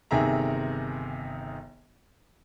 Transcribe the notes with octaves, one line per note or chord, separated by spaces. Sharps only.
G1 C3 D#3 G#4 E5 A#5